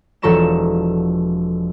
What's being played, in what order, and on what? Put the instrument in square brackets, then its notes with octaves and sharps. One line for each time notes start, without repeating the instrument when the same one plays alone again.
[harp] E1 F3 A4 A#5 C#6 E7